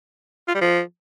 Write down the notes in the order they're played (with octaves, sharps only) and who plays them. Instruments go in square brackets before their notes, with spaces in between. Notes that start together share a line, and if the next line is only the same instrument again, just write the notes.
[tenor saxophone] F4
G3
F3